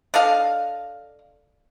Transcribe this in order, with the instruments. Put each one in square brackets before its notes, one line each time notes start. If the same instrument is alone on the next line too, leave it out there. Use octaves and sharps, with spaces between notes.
[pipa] D4 A4 D#5 F5